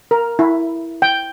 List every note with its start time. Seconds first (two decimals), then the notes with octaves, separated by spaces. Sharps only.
0.11 A#4
0.39 E4
1.02 G5